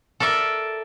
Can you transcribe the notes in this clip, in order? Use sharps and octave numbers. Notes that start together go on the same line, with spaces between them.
A4 A#4 D5 E5